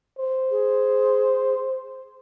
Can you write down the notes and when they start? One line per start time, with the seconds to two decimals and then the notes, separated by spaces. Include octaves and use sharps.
0.18 C5
0.51 G#4